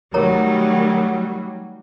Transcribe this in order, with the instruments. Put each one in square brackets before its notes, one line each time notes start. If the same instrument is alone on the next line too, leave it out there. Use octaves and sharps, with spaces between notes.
[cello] D#3 A3 [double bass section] F#3 G3 [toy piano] A#4 C#5 A#5